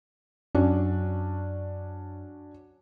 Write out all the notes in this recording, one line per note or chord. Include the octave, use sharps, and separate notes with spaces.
F#2 F#3 C#4 D4